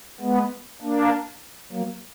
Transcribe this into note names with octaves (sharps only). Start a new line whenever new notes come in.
G#3 B3
A#3 D4
F#3 A#3